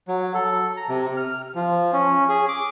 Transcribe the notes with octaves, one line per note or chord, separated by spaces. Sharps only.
F#3
A4
A#5
C3
F6
F3
C#4
G#4
D6